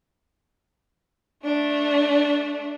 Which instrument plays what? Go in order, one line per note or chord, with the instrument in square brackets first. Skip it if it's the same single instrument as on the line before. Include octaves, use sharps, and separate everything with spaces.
[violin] A3 D4